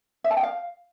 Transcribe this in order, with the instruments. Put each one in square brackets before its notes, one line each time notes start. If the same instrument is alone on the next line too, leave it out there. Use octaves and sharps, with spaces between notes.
[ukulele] E5
A5
G5
F5